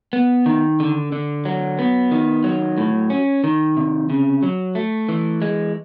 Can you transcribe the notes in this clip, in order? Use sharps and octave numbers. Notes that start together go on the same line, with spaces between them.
B3
D#3
D3
D3
F#3
B3
D#3
F#3
A2
C#4
D#3
C3
C#3
F#3
A3
E3
G#3